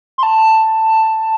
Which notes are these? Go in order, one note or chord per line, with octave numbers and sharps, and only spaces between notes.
C6
A5